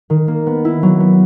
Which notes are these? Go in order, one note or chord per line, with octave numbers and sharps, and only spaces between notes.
D#3
A#3
B3
E4
F#3
B3